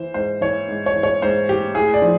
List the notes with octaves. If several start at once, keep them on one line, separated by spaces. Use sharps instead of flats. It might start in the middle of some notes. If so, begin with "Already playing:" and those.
Already playing: E3 C5
G#2 C5
E3 C#5
G#2
C#5
E3
C#5
G#2 C5
E3 G4
A2 G#4
D5
F3